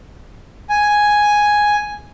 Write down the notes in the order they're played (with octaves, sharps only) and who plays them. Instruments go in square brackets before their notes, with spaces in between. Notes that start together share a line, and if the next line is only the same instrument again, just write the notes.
[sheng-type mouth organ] G#5